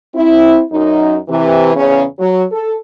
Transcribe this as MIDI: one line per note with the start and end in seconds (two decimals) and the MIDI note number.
0.15 0.61 60
0.15 0.61 64
0.72 1.16 42
0.72 1.16 63
1.28 1.71 48
1.28 1.71 52
1.75 2.04 40
1.75 2.04 49
1.75 2.04 61
2.19 2.43 54
2.52 2.75 69